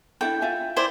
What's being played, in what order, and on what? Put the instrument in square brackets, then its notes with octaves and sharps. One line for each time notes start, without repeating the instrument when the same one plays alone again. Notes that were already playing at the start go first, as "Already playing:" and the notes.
[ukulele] D4 E4 A4 [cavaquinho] G5
[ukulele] F4 E5 G#5
[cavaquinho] E4 C5 D5